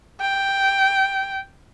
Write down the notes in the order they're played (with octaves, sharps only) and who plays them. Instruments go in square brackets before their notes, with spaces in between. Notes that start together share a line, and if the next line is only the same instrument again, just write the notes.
[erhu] G5